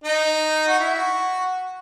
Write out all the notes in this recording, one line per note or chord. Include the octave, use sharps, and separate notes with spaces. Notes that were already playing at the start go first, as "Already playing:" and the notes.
D#4
F#4
E4
F#4